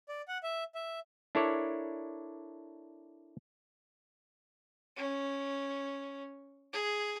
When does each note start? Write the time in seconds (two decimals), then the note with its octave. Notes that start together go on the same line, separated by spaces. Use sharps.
0.09 D5
0.28 F#5
0.43 E5
0.75 E5
1.35 D4 E4 A4 A#4 C#5 D5
4.96 C#4
6.73 G#4